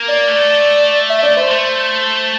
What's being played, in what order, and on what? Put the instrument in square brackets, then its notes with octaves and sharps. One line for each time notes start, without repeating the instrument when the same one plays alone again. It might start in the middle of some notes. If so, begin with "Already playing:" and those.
Already playing: [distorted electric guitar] A#3
[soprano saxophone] D5
[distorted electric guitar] A3
[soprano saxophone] E5
D5
C5
[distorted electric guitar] A3